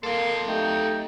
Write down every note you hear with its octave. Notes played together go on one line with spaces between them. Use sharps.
A#3 A4 F5 C6
A3 D#4 G4 G5